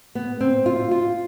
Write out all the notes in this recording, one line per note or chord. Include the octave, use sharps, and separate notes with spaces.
B3
C4
F4
F4